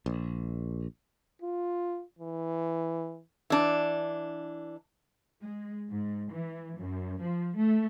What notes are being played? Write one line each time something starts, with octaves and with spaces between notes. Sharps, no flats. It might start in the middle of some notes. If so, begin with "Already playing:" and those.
A#1
F4
E3
E3 D4
G#3
G#2
E3
F#2
F3
A3